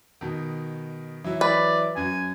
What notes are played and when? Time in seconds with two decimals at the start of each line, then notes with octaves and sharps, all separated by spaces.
0.21 B2 D#3
1.24 E3 F#3 E4
1.41 B4 D5
1.96 F#2 F#4 G#5